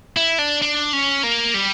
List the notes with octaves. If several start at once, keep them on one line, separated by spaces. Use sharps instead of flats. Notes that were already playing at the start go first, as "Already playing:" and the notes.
E4
D4
D4
C#4
A#3
G3